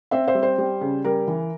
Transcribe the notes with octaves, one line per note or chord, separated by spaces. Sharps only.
C4 C5 E5
C5 E5
G3
C5
G3
C#3
G3 A#4
E3